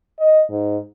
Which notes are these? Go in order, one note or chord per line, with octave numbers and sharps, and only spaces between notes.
D#5
G#2